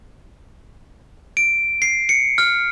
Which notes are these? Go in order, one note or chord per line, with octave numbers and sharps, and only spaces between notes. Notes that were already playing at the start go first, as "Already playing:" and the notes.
D7
C7
C#7
F6